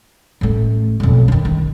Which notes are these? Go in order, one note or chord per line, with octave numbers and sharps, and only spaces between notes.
A1 A3
B1 F2
D3 D#3
D#3